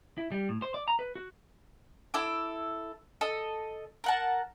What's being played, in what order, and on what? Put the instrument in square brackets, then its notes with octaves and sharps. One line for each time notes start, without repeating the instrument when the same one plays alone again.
[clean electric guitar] E4
G3
A2
C5
D5
A#5
B4
F#4
[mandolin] E4 A4 D6
A4 D#5
A#4 F#5 A5